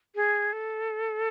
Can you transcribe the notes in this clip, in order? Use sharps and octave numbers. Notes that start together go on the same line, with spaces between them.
G#4
A4